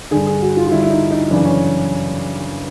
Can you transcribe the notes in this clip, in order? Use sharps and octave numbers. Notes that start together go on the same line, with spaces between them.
G2 D3 G#4
G#4
F#4
F4
F4
G2 D3 E4
E4
D#4
D#4
F#2 C#3 E3 D4
C#4